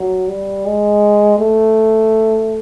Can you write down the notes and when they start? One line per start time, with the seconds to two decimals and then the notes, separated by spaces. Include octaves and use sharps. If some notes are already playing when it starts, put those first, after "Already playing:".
Already playing: F#3
0.28 G3
0.66 G#3
1.39 A3